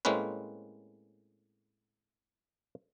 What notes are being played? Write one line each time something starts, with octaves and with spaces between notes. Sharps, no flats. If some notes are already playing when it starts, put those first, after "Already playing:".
A2 G#3 A#3 C4 C#4 B4